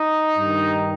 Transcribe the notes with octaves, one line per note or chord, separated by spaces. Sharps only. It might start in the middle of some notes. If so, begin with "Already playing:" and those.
Already playing: D#4
G2 D#3